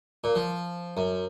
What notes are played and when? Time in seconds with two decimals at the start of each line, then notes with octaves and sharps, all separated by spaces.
0.24 A#2
0.35 F3
0.97 F#2